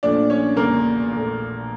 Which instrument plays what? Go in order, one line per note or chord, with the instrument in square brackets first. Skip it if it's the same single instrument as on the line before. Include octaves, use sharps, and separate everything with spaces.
[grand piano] A#1 A#2 F3 A3 D4 D5
C#4 C#5
E1 E2 C#3 A#3 A#4
A#1 A#2 A3